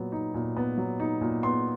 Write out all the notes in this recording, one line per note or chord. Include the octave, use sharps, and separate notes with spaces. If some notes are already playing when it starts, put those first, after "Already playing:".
Already playing: A#2 F#3 B3
D#4
A#2
B3
F#3
D#4
A#2
B3 C6